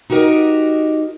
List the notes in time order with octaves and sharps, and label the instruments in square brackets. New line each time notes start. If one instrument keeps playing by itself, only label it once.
[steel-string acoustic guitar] D#4 F#4 G4 A#4 D#5